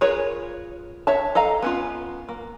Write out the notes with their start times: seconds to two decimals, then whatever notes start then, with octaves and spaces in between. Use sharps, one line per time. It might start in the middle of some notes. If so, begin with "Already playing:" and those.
0.01 F4 G#4 A#4 B4 C#5
1.07 C#5 E5 A5
1.35 A4 D#5 F5 A#5
1.62 B3 C#4 F4
2.29 A#3